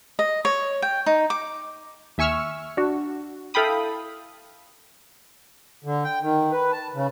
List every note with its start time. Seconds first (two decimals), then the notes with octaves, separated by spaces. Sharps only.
0.19 D#5
0.45 C#5
0.82 G5
1.06 D#4
1.30 D6
2.18 D#2 E5 G#5 C#6 E6 F6
2.77 D4 F#4
3.54 E4 A4 F5 G5 B5 D#6
5.84 D3
6.04 G5
6.22 D#3
6.52 B4
6.72 A5
6.94 C#3